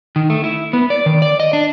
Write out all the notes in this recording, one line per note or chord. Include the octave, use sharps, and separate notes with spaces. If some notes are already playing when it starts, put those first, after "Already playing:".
D#3
A3
E4
B3
D5
D#3
D5
D#5
D4